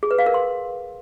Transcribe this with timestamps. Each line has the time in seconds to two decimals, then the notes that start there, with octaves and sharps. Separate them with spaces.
0.03 G#4
0.11 B4
0.18 F5
0.26 A#4
0.34 C6